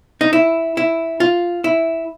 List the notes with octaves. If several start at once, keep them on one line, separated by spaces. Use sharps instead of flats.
D#4
E4
E4
F4
E4